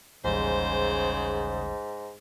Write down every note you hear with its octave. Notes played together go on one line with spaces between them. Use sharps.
A1 D#2 G#2 C#3 G3 C5